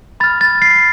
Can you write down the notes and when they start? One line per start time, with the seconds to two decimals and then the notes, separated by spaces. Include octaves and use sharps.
0.20 B5 F6 A6
0.41 A6
0.62 A6 C7